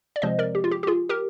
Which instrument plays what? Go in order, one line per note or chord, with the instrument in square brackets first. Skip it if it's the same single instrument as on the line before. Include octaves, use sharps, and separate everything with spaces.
[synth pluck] D5
C3 F3 G#3 C4 C5 D#5
A#4 D5
G4
F4
G4
G4
F4 G#4
G4 A#4